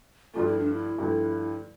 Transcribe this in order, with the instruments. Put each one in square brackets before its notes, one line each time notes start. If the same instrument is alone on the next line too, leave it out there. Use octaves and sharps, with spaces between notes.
[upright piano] G2 D3 F3 A3 [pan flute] F4
[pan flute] E4
D4
E4
[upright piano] G2 D3 F3 A3